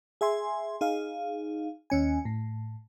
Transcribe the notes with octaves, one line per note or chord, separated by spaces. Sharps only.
G#4 E5 G#5 C6
D#4 G#4 F5
D#2 C#4 G#5
A2